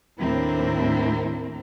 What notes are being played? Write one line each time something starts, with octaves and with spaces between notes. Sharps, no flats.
D#2 A2 C4 D4 E4 A#4